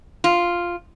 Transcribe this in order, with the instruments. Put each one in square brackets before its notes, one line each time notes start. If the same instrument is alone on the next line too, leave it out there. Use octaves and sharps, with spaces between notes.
[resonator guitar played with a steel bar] F4